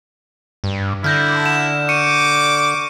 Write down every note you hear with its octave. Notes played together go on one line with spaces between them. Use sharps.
G2
D3 E4 F6 G6 A#6
E7
C#6 D6 C#7 D#7